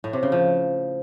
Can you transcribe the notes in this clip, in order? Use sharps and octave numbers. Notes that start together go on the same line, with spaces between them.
A2
C3
C#3
F3